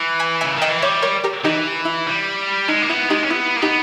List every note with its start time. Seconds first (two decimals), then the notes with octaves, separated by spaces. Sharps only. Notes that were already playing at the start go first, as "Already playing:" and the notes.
Already playing: E3
0.19 G#5 B5
0.41 C#3 E5 G#5
0.56 D#3
0.62 D#5 G5
0.69 E3
0.82 G3 C#5 E5
1.02 A#4 C#5
1.24 G4 A#4
1.44 E3 D#4 G4
1.85 E4
2.07 G3
2.68 G#3 D#4
2.82 A#3
2.89 B3 E4
3.10 G#3 D#4 G4
3.23 C#4
3.30 B3 E4
3.56 A#3
3.61 B3 D#4 G4